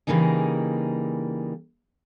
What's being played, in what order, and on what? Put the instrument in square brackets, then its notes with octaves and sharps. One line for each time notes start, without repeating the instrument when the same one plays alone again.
[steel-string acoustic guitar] C#3 E3 G3 A#3 D#4 G#4